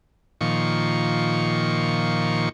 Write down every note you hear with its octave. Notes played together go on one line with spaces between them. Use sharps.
A#2 D#3 F3 C#6